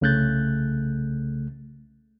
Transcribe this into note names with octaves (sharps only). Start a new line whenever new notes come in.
C2 C#3 A3 F#6 G6 A6